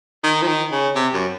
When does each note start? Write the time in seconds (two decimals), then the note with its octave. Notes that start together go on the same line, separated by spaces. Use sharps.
0.24 D#3
0.42 F3
0.48 D#3
0.72 C#3
0.96 C3
1.14 F#2